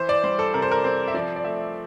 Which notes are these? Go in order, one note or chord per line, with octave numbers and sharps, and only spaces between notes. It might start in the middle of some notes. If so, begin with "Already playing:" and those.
Already playing: E3 C5
D5
G3 C5
A4
C3 A#4
C5
A#4
C4 C5
E5
F3 D5
D5
A3 E5